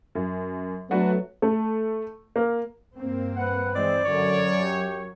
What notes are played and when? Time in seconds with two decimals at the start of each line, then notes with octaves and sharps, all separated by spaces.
0.15 F#2
0.91 F#3 A3 B3 D4 F#4 B4
1.42 A3
2.36 A#3
2.95 G2 A#3 C4
3.36 B4 F#5
3.76 E3 G#3 C4 D5
4.05 F#2 D3 F#3 C#5
4.57 G4